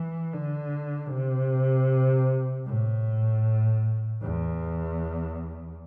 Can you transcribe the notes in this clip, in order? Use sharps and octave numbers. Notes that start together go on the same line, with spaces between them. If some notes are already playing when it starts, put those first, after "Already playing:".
Already playing: E3
D3
C3
A2
E2